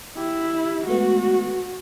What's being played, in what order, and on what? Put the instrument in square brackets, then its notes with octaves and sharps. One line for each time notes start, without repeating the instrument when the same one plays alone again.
[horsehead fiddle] E4 [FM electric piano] G4
[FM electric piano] G#3 A3 B3 [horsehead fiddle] F#4